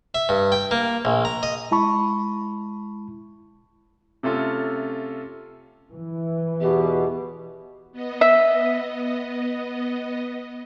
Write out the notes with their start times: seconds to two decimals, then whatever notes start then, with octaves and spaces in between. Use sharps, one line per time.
0.15 E5
0.29 G2
0.52 G5
0.71 A#3
1.05 A#1
1.25 A#5
1.43 D#5
1.71 G#3 E4 A5 B5 C#6
4.23 C3 A3 C#4 F4 A4
5.94 E3
6.61 E2 B2 G4
7.92 B3 D#5
8.21 E5